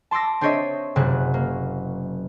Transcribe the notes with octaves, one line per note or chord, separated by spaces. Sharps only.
A5 C6 D6 E6 A#6
C4 D4 C5 C#5 D#5 E5
F#1 C3 F#3 C#4 F#6
A#3